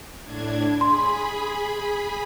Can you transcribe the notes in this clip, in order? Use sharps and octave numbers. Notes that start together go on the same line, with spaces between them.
A2 D4 G#6
G#4 B5 C6